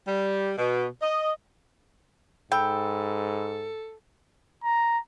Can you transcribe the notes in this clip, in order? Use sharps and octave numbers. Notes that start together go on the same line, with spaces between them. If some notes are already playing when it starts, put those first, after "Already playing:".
G3
B2
D#5
G#2 A4 G5 B5 E6
A#5